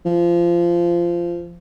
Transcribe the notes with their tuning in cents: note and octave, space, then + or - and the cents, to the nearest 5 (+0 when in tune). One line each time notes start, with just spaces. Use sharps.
F3 -20